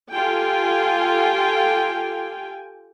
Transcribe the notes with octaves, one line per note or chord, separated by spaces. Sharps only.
F4 G4 A4 G5 G#5